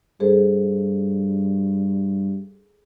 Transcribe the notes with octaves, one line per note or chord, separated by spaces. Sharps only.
G2 G#4 A4 C5